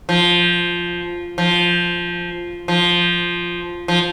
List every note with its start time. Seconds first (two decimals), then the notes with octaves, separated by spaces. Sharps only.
0.09 F3
1.38 F3
2.68 F3
3.88 F3